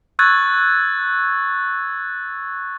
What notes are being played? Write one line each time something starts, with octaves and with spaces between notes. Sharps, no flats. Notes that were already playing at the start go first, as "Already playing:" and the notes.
C#6 E6 F#6 G#6 A6